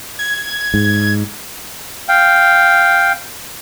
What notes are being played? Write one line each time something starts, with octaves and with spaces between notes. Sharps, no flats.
G#6
G#2
F5 G5